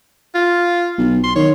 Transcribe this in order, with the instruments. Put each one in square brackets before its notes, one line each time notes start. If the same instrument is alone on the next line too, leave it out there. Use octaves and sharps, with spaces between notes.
[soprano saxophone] F4
[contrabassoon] B1
[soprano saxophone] C6
[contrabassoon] D#3 [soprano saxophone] C#5